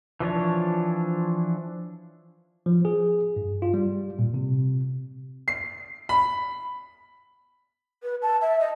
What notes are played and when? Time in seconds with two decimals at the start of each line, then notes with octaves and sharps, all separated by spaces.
0.20 E3 F3 D4 C#5
2.66 F3
2.85 G#4
3.36 G2
3.62 F4
3.74 G3
4.19 A#2
4.34 C3
5.48 C7
6.09 B5
8.03 B4
8.22 A5
8.41 E5
8.60 D#5